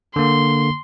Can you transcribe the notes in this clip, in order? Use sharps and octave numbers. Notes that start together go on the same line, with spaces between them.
D3 A#3 C6